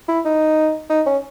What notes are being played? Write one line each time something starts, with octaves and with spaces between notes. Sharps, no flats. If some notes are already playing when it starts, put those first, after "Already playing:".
E4
D#4
D#4
C#4